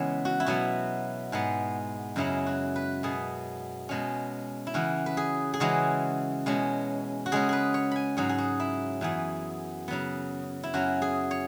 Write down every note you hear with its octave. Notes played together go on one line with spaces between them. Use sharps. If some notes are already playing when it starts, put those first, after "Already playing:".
Already playing: C#3 E3 G#3 B3 C#5 E5
F#4
E4
B2 F#3 B3 F#4
G#2 G#3 B3
F#2 C#3 G#3 C#4 E4
F#4
B4
B2 B3 G#4
B2 G#3 C#4
E4
C#3 E3 C#4 F#4
B4
G#4
G#4
C#3 E3 G#3 C#4 F#4
B2 G#3 C#4
F#4
C#3 G#3 C#4 G#4
G#4 B4
C#5
G#5 B5
G#2 F#3 C#4 G#4
G#4
F#4
E4
F#2 E3 B3 G#4
C#3 F#3 B3
E4
F#2 F#3 C#4 F#4
G#4
C#5